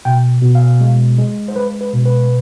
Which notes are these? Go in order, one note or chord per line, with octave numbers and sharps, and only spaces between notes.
B2 G5
B2
F5
G#3
G#3
C5
G#3 B4
B4
B2
B4